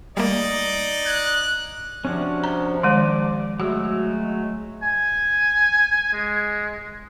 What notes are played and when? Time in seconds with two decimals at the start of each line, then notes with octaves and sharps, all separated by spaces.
0.17 G3 A3 A#3 D#4 D5 D#5
1.07 F#6 G#6
2.05 C3 F3 C#4 D4 F#4
2.44 A#5
2.83 D#3 G#3 D5
3.60 F#3 G#3 A3 F#4 E6
4.83 G#5
6.13 G#3